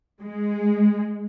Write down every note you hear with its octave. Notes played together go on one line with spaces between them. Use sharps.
G#3